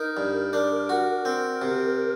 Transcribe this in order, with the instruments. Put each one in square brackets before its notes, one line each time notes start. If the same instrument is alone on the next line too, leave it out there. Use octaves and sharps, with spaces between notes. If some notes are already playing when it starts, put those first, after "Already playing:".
Already playing: [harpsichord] D#4 [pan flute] A#4
[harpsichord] G2
D4
F#4
[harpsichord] C4 [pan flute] A#4
[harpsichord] C3